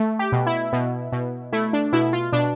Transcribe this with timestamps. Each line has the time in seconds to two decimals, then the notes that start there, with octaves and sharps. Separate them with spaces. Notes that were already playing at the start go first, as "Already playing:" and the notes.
Already playing: A3
0.19 G4
0.32 B2
0.47 E4
0.73 B2
1.12 B2
1.53 A3 E4
1.73 D4
1.93 B2 E4
2.13 F4
2.33 B2 D4